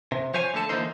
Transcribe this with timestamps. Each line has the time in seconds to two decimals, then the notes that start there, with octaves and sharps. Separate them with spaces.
0.12 C3
0.34 F3 C5 C#5 F5 G#5
0.54 D3 A3 A4 A5
0.69 D3 E3 A#3 C4 D#4 C5